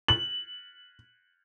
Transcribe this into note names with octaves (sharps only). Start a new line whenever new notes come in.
F#7